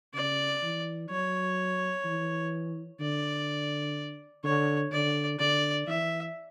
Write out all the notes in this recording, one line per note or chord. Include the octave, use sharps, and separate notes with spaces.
C#3 D5
E3
F#3 C#5
E3
D3 D5
D3 C#5
D3 D5
D3 D5
E3 E5